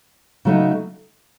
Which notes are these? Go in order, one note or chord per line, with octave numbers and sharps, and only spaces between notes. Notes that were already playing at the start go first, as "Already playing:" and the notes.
C#3 F#3 A3 C4 D#4